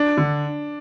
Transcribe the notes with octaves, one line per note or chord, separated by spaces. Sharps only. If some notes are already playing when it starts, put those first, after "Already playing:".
Already playing: D4
D3